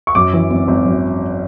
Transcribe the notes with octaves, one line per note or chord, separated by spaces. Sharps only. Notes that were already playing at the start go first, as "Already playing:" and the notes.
C#6
F#2 D6
E3
G#1
G#1
F#2